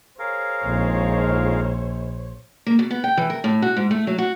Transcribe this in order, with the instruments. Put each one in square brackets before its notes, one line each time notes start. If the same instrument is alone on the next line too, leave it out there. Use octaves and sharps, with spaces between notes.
[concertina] G#4 A#4 F5 [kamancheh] C5 C#5
[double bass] A#1 [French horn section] F2 G#2
[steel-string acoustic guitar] A#3
B2
B3
G5
E3
A#4
A2
F#4
G#2
A3
F#3
F#4